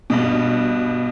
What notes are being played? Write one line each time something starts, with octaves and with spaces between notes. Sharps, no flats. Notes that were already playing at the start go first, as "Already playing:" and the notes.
G2 B2